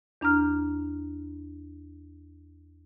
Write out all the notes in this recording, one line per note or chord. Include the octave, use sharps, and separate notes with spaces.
E2 D4 A#5 F6